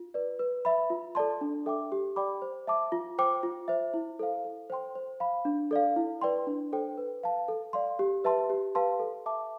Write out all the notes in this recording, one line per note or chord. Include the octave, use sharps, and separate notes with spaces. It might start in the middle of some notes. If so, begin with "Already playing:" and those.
Already playing: F4
B4 D5
B4
E5 B5
F4
A4 D5 A5 C6
D4
A4 E5 G5 D6
G4
D5 G5 B5 D6
C5
E5 A5 D6
F4
C5 G5 D6
F4
C5 E5
E4
A4 C5 F5
A4
C5 G5 C6
C5
F5 B5
D4
A4 D5 F5
E4
B4 D5 G5 C6
D4
A4 C5 G5
B4
F5 A5
A4
D5 F5 C6
G4
B4 E5 A5 C6
G4
B4 F5 A5 C6
A4
E5 A5 D6